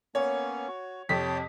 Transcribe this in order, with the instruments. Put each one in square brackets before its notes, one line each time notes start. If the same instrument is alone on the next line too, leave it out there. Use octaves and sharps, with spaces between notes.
[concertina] A#3 B3 C#4 [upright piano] C#5
[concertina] F#4
[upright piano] F2 C3 B6 [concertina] C#5 G5 A5